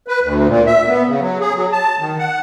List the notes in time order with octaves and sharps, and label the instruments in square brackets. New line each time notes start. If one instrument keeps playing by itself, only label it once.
[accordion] B4
D2
A#2
E5
B3
C#3
F#3
G#4
F#3
A5
D#3
F#5